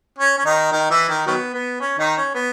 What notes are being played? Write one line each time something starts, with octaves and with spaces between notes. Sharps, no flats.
C#4
C#4
D#3 D#4
D#3 D#4
E3 E4
D#3 D#4
D#3 F#3 B3
B3
C#4
D#3 D#4
C#4
B3